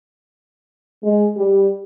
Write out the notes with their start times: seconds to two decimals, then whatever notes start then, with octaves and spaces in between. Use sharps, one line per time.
1.03 G#3
1.37 G3